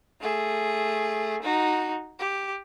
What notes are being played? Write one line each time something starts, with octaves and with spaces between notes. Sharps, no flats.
A3 G#4
D#4 F#4
G4